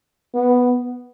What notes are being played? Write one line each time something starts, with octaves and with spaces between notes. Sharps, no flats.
B3